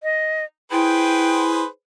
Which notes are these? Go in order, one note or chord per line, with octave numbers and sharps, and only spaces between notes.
D#5
E4 G#4 B4 C5 G5